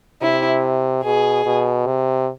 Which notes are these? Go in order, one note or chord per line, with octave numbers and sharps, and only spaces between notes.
C3 E4
B2 G#4
B2
C3